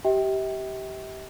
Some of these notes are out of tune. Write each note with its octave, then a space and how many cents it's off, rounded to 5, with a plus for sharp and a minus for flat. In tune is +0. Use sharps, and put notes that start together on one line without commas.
G4 -20 E5 -40 G5 +0